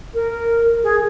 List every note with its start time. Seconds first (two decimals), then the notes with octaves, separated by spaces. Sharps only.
0.14 A#4
0.83 G#4